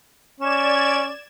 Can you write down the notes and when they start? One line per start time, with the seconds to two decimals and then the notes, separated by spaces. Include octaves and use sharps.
0.40 C#4 D5 G#6 E7